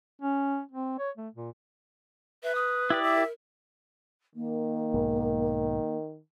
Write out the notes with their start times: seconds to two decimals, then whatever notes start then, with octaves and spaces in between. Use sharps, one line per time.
0.22 C#4
0.71 C4
0.99 C#5
1.17 A3
1.35 A#2
2.43 B4 E5
2.55 D#6
2.90 E4 G4 D5
3.03 E5
3.15 A#4
4.35 D#3 A#3
4.94 B1 G#2